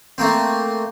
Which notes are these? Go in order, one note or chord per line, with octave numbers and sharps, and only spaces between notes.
A3 A#3 C4